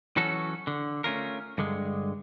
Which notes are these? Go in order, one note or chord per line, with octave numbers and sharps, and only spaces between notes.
E3 F#3 C#4 F#4 A4
D3
A3 C#4 F4 A#4
G2 D3 G#3